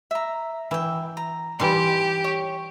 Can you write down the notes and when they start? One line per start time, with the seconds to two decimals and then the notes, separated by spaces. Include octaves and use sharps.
0.11 E5 A#5
0.71 E3 E5 G5
1.17 A#5
1.60 E3 G3 D#4 G4 C6
2.24 C#5